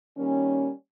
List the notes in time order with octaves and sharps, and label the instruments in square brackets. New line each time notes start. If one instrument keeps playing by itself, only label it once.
[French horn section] D#3 G3 A#3 C#4